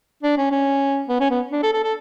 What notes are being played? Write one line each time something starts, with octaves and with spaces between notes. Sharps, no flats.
D4
C#4
C#4
B3
C#4
B3
D4
A4
A4
A4